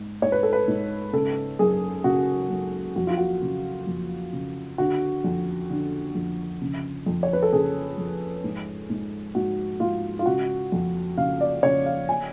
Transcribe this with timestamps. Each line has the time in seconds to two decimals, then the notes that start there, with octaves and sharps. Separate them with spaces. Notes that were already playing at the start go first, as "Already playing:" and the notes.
Already playing: G#2
0.22 G#2 C#5
0.32 B4
0.43 A4
0.53 B4
0.68 G#2
1.13 C#3 A4
1.59 F#2 G#4
2.04 C#3 F#4
2.50 F#2
2.96 F2 F#4
3.07 F4
3.17 F#4
3.42 C#3
3.87 F2
4.33 C#3
4.78 D3 F#4
5.24 F2
5.70 D3
6.15 F2
6.61 C#3
7.06 F2
7.23 C#5
7.33 B4
7.43 A4
7.53 C#3 G#4
7.98 F2
8.44 G#2
8.90 G#2
9.35 G#2 F#4
9.80 G#2 F4
10.19 F4
10.26 C#3 F#4
10.72 F2
11.17 C#3 F5
11.41 D5
11.63 C#3 C#5
11.86 F5
12.09 G#5